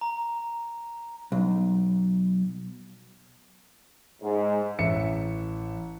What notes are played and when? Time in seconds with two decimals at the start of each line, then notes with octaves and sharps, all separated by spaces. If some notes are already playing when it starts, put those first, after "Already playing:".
0.01 A#5
1.32 B1
4.22 G#2
4.79 A1 E5 C#7